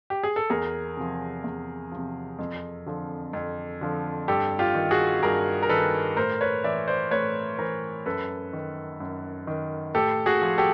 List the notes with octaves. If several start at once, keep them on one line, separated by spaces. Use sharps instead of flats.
G4
G#4
A4
E2 G#4 A#4
C3 F3
E2
C3 F3
F2
D3 F3
F2
D3 F3
G2 G4 A4
F4 G4
D#3
F#4 G#4
G2 G#4 A#4
A#4
D#3 A4 B4
A2 A#4 C5
B4 C#5
E3 D5 E5
C5 D5
A2 B4 C#5
E3 A#4 C5
F#2 A4 B4
D#3
F#2
D#3
A2 G4 A4
F#4 G#4
F3
G4 A4